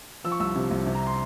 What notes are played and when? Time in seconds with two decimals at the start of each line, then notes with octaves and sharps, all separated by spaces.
0.24 F3 E6
0.32 C#6
0.40 C2 E6
0.55 C3
0.71 C2
0.87 C3
0.95 A#5
1.07 C6